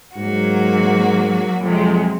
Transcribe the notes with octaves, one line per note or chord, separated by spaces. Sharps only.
G#2 F#3 A#3 F#4
F2 C3 F#3 G#3